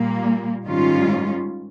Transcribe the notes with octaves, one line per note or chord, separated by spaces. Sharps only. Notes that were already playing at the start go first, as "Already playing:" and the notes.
Already playing: A#2 G3 A#3
G#2 D#3 G3 C#4 F4